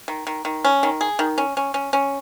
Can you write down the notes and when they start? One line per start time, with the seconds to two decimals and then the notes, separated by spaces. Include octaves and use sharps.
0.08 D#3
0.27 D#3
0.45 D#3
0.65 C#4
0.83 D#3
1.01 G#4
1.19 D#3
1.38 C#4
1.57 C#4
1.74 C#4
1.93 C#4